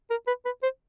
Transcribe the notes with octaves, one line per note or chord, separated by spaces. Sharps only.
A#4
B4
B4
C5